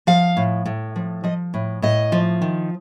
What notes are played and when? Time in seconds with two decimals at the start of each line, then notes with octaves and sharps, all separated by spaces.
0.07 F3 F5
0.37 A2
0.66 A2
0.96 F3
1.24 F3 D#5
1.54 A2
1.82 A2 D#5
2.12 F3
2.42 D#3